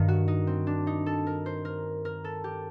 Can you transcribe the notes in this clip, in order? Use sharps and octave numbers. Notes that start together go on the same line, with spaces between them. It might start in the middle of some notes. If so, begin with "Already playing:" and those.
Already playing: G2 D#3 D#4
F#4
D#4
C4
D4
D#4
A4
A#4
C5
A#4
A#4
A4
G4